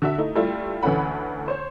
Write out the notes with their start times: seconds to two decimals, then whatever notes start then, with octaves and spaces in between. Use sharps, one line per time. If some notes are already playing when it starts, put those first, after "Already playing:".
0.02 D3 F#4 E5
0.18 A3 D#4 E4
0.36 G3 A3 E4 F4
0.83 D2 E3 A3 C#4 F#5 B5
1.48 C5 C#5